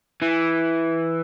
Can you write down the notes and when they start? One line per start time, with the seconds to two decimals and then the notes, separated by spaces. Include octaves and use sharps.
0.22 E3